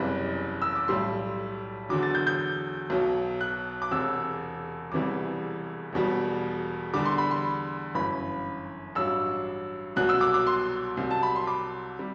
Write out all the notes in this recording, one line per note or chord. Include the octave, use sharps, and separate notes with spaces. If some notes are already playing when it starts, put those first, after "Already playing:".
Already playing: F#1 E2 C3 E3 G3
E6
D6
B1 A2 G3 C6
E2 D3 F#3 D6
A6
G6
G6
B1 B2 F#3
F#6
D6
E1 E2 C3 E6
E1 E2 C3 E3 G3 D6
E1 E2 B2 G3
E2 D3 G3 D6
C6
B5
C6
G1 F#2 E3 B5
A1 G2 F#3 E6
C2 B2 F#3 F#6
E6
D6
D6
C6
C2 C3 F#3
A5
B5
C6
D6
C3 G3